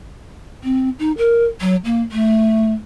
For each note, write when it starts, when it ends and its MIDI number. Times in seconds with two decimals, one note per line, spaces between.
0.64 0.90 60
0.99 1.12 63
1.18 1.45 70
1.61 1.76 54
1.85 2.01 58
2.12 2.72 57